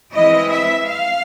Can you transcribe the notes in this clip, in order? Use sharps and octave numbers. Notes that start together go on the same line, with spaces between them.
E3 G#3 C4 E4 D#5
E5
F5